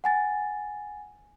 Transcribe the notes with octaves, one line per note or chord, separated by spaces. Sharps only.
F#5 G#5 A6